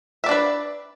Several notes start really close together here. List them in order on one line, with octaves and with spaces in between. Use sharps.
E5 D5 D4 B4